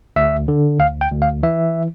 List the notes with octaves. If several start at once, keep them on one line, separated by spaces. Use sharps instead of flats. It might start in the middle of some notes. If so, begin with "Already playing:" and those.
D2 E5
D3
D2 F5
G5
D2
F5
E3 E5